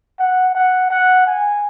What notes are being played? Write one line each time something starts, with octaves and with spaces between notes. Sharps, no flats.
F#5
F#5
F#5
G#5